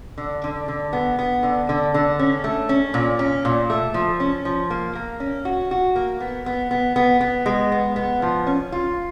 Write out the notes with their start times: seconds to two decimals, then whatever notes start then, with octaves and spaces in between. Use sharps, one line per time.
0.18 D3
0.44 D3
0.68 D3
0.93 B3
1.19 B3
1.43 D3
1.69 D3
1.94 D3
2.19 C#4
2.44 A3
2.69 C#4
2.94 A#2
3.19 C#4
3.45 A#2
3.70 A3
3.94 F3
4.20 C#4
4.45 F3
4.70 A#3
4.95 A#3
5.20 C#4
5.45 F#4
5.71 F#4
5.96 A#3
6.20 B3
6.46 B3
6.71 B3
6.96 B3
7.21 B3
7.46 G#3
7.72 B3
7.96 B3
8.22 F3
8.47 C#4
8.72 F4